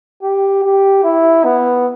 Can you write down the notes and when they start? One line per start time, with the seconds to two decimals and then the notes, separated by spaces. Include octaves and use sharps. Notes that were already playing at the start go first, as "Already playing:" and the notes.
0.23 G4
0.63 G4
1.04 E4
1.44 B3